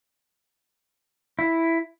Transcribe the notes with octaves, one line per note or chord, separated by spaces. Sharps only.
E4